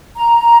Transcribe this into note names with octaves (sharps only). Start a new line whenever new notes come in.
A#5